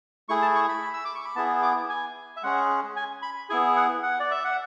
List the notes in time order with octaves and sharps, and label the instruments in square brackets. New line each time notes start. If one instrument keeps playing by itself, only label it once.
[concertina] A3 E4 G#4 C#6
A5
C#6
B5
E6
D6
C#6
B5
B3 E4 G#4 A5
D6
G#5
E5
G#3 C#4 G#4 F#5
G#5
B5
B3 E4 G#4 G#5
F#5
F#5
D5
E5
F#5